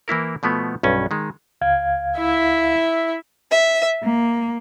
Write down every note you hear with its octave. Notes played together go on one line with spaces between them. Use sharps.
E3 A#3 E4 A#4
B2 F3 A3 B3
B1 G2 C#4
D#3 G#3
C#2 F5 G#6
E4 E5
E5
A#3